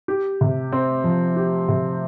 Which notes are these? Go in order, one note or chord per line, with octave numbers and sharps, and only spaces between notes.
G4
C3
C4
F3
G4
C3